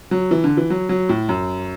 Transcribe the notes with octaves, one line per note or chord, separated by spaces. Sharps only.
F#3
E3
D3
E3
F#3
F#3
A2
F#2